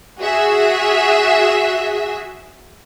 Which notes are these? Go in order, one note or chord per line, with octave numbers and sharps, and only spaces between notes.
F#4 G#4 E5